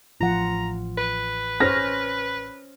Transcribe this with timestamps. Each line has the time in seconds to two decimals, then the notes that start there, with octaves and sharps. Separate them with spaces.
0.21 A1 F3 F4 F#5 A#5
0.98 B4
1.60 C#4 C5 C#5 F6 A#6